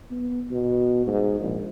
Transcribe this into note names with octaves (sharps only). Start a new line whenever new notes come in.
B3
B2
G#2
A#1